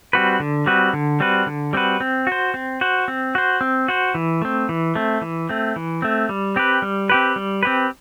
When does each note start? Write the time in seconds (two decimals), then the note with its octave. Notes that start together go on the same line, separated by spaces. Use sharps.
0.13 G3 C4 F#4 B4
0.40 D3
0.66 G3 C4 F#4 B4
0.93 D3
1.20 G3 C4 F#4 B4
1.47 D3
1.73 G3 C4 F#4 B4
2.00 C4
2.27 F#4
2.32 C5
2.54 C4
2.81 F#4 C5
3.08 C4
3.35 F#4 C5
3.61 C4
3.88 F#4 C5
4.15 E3
4.42 A3 C4
4.69 E3
4.95 A3 C4
5.21 E3
5.49 A3 C4
5.76 E3
6.02 A3 C4
6.29 G3
6.56 C4 G4 B4
6.82 G3
7.10 C4 G4 B4
7.36 G3
7.63 C4 G4 B4